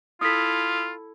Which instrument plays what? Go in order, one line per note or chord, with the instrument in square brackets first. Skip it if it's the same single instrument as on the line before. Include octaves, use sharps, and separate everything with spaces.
[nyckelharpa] E4 A4 [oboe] F4 [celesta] D#6 B6